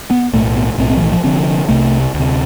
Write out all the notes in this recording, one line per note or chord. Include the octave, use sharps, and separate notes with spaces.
B3
B1 A2 A3
B3
B1 A2 C4
C4
F3
E3
F3
F1 F2 D3 C4
C2 C3 A3
D2
C3